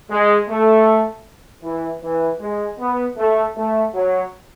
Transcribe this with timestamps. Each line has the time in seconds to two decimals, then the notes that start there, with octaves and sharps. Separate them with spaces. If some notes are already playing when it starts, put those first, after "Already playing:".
0.10 G#3
0.49 A3
1.63 E3
2.02 E3
2.40 G#3
2.79 B3
3.17 A3
3.57 A3
3.94 F#3